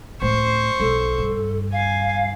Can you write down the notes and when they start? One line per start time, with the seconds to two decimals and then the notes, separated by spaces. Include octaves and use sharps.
0.22 C#2 A2 C5 C#6
0.80 B1 A4
1.18 G2
1.73 F5 G#5